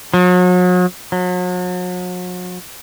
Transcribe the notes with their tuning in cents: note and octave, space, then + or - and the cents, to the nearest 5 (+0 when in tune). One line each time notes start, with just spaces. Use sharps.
F#3 -40
F#3 -40